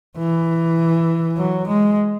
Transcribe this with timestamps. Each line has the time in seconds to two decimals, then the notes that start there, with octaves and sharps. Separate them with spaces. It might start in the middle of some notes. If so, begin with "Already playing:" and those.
0.17 E3
1.38 F#3
1.67 G#3